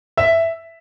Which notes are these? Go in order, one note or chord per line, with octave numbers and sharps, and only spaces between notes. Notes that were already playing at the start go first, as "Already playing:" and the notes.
E5